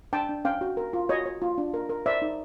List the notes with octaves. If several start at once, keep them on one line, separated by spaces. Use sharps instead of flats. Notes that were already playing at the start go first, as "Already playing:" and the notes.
D4 G5 A5
D4
C#4 F5 G5
F#4
A#4
F4
F#4 C#5 D#5
C#5
F4
D4
A#4
A#4
C5 D5 E5
D#4